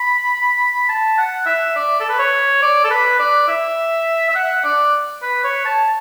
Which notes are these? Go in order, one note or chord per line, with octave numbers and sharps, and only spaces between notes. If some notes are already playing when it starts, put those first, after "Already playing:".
Already playing: B5
A5
F#5
E5
D5
A4
B4
C#5
D5
A4
B4
D5
E5
E5
F#5
D5
B4
C#5
A5